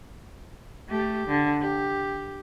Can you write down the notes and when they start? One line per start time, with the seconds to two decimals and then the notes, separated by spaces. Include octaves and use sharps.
0.89 A3 G4
1.28 D3
1.61 G4